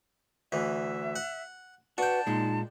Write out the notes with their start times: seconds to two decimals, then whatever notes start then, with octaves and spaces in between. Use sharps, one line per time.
0.52 D2 E3 E5
1.16 F#5
1.98 D4 F#4 B4 G5 A5
2.27 A#2 G#3 D#4